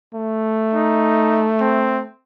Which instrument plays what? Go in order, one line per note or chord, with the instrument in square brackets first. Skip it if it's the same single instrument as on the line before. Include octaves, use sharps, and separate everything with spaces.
[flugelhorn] A3
[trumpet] D#4
C4